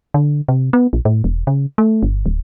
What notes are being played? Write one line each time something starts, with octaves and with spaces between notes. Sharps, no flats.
D3
C3
B3
A#1
A2
E1
C#3
A3
G1
D1